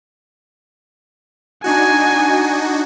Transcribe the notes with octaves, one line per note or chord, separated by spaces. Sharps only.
D4 D#4 F#4 G#5